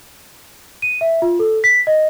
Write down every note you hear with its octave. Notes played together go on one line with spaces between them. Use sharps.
D#7
E5
F4
A4
B6
D#5